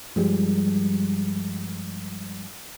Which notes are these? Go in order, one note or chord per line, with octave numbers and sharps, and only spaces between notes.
G2 F3 G3 G#3